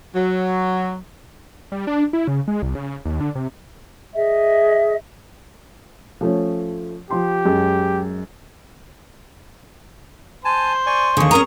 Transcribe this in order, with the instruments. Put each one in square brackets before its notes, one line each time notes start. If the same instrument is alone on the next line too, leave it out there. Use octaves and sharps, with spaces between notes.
[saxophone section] F#3
[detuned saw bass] G3
D4
E4
C#3
G#3
C2
C#3
D#2
D3
C3
[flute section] G#4 D#5 E5
[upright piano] F3 A3 C#4
[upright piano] F3 C6 [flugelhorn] G4
[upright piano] F#2 G#3
[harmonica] C5 [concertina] G#5 A5
[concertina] D5 G#5 C#6
[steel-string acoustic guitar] D#2 D3 [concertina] G#4 C#6
[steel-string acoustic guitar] C#4 A#4 A#5 [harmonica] D#6